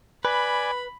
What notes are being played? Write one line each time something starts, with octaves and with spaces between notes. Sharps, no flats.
B4 D5 G#5 B5